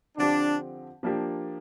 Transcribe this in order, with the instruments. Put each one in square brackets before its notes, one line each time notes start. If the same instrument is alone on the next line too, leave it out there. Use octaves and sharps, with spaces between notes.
[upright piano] D3 F3 C4 G4 [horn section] D4
[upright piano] F3 A#3 D4 G4